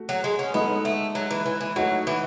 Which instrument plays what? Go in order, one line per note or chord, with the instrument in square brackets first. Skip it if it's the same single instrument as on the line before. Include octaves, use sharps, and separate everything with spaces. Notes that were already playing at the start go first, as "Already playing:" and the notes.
Already playing: [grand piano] A3 F#4
[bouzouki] F#3
G#3
C#4
[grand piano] G#3 D#4 A4 [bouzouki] B3
[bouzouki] A3
F#3
E3
E3
E3
[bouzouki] F#3 [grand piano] A3 D#4 F#4 A4
[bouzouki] E3